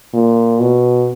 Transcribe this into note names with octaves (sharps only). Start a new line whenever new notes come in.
A#2
B2